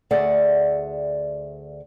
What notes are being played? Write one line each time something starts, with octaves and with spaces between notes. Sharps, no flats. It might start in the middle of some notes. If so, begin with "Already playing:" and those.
D2 G#4 D5 E5 F#5